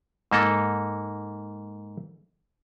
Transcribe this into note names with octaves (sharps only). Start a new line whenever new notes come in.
G#2 A#3 A4